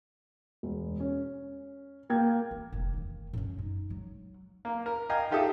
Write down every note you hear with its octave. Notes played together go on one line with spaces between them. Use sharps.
E1
C#4
A#3 G5 G#6
E4
F1
D#3 A3
F#2 C#4
D#4
F#3
A#3
A#4
D#5 F5 G5 G#5 A#5
D#4 F4 G4 A4 E5 D#6